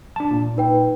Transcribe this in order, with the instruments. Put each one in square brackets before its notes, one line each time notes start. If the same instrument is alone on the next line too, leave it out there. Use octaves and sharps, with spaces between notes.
[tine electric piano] D4 A5
A#2
[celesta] D#4 B4 G5